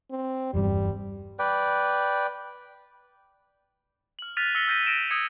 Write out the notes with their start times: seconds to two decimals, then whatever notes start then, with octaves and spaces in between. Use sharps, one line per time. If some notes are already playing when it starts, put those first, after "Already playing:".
0.11 C4
0.54 F1 E2 G2 G3
1.39 B4 D5 G5
4.19 F6 F#7
4.37 F6 F#6 A6 B6 D#7 F7
4.55 E6 A#6 B6 C#7 G7
4.67 E6 F6 G6 A#6 B6 D#7
4.87 E6 F6 A#6 B6 D7 E7
5.10 D#6 E6 G#6 A#6 C#7